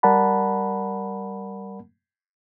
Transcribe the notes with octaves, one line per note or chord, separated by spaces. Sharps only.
G3 A#4 D5 F#5 A5 B5